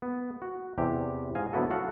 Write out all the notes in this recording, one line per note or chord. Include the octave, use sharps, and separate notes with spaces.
B3
F#4
E2 C3 G4
G#2 D#5 F5 G#5
D3 F#3 B3 E4 F#4 A4
F#4 A4 F5 F#5